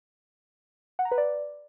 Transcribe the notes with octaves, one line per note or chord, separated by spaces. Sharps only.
F#5
A#5
B4
D5